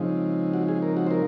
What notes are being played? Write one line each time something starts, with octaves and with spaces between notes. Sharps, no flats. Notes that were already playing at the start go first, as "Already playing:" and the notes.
Already playing: C#3 F3 G#3 C4 D#4
F#4
G#4
A#4
F#4
C5
A#4